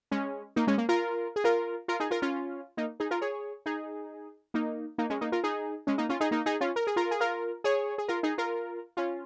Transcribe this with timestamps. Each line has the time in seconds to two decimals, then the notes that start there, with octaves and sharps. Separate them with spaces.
0.11 G#3 C#4
0.56 A#3 D#4
0.67 G#3 C#4
0.78 A#3
0.89 F4 A#4
1.36 G#4
1.44 F4 A#4
1.88 F4 A#4
2.00 D#4 G#4
2.11 F4 A#4
2.22 C#4 F4
2.77 A#3 D#4
3.00 D#4 G#4
3.11 F4 A#4
3.21 G#4 C#5
3.66 D#4 G#4
4.54 A#3 D#4
4.98 A#3 D#4
5.10 G#3 C#4
5.21 A#3 D#4
5.32 F4 A#4
5.44 D#4 G#4
5.87 G#3 C#4
5.98 A#3 D#4
6.09 C#4 F4
6.20 D#4 G#4
6.31 A#3 D#4
6.46 D#4 G#4
6.61 C#4 F4
6.76 A#4
6.87 G#4
6.96 F4 A#4
7.11 G#4
7.20 F4 A#4
7.64 G#4 C#5
7.98 G#4
8.08 F4 A#4
8.23 D#4 G#4
8.38 F4 A#4
8.97 C#4 F4